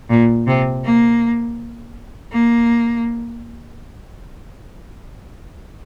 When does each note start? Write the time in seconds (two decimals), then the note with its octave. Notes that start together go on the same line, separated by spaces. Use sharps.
0.10 A#2
0.47 C3
0.84 A#3
2.32 A#3